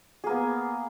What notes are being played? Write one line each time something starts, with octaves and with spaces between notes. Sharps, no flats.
A#3 B3 G#4